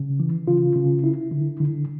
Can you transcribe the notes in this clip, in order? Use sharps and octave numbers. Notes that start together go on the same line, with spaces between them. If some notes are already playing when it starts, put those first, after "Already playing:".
Already playing: C#3
E3
C#3 F4
C#3
E4
D3
D3